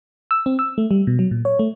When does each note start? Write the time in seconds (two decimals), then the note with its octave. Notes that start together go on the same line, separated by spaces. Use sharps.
0.31 E6
0.46 C4
0.59 E6
0.78 A3
0.91 G3
1.07 B2
1.19 F#3
1.31 A#2
1.45 C#5
1.59 A3